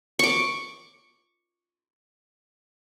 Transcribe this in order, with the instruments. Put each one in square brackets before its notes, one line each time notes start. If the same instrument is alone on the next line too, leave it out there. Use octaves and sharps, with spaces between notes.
[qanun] C#6 D6